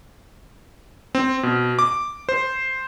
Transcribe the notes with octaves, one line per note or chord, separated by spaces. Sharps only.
C4
B2
D6
C5